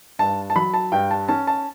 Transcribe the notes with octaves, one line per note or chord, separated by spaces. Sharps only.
G2 A5
A5
F#3 B5
A5
G2 G5
A5
C#4 A5
A5